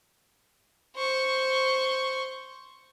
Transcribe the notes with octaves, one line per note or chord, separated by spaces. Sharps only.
C5 C#6